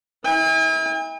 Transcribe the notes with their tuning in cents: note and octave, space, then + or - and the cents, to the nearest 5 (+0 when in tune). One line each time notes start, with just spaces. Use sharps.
E4 -35 G#5 -45